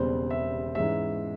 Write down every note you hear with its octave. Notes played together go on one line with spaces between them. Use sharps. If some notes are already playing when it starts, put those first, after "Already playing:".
Already playing: E1 E2 C#3 G3 C4 C5
E5
G#2 E3 G#3 C#4 E5